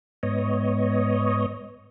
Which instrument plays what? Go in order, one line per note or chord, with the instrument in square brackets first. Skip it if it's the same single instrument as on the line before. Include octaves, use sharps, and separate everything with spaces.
[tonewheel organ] G#2 B3 C#5 D#5